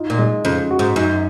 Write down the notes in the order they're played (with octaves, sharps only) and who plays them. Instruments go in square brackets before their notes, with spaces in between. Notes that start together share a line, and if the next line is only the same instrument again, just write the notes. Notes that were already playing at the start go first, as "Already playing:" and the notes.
Already playing: [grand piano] D#4 F4
[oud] A#2
[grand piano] G#3
[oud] F2 [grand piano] C#3
[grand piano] F#4
[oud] G#2
[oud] F#2 [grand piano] D#4